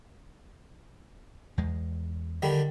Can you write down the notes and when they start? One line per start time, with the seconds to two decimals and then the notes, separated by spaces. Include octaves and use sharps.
1.58 E2 G#3
2.42 D3 D#3 G3